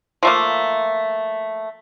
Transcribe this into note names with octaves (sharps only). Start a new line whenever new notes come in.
F3 A3 A#3